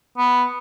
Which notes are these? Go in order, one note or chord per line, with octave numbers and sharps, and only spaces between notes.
B3